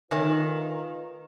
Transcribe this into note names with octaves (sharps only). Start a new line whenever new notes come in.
D#3 A3 F4 B4 C#5 G#5